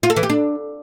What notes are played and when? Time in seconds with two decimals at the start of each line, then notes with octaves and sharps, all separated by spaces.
0.03 F4
0.10 A4
0.16 E3
0.23 G4
0.30 D4